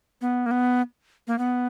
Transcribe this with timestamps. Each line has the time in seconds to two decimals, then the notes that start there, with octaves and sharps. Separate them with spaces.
0.21 B3
0.46 A#3
0.51 B3
1.27 A#3
1.39 B3